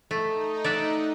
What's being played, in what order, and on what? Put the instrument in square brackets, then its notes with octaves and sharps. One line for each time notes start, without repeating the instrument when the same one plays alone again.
[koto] A3 [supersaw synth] D#4
[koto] D5 E5 F#5